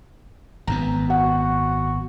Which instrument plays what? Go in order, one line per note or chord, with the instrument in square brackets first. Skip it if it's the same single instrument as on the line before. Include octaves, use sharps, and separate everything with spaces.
[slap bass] G#1 F#2 B3 [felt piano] A#5
[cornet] F#4 [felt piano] F#5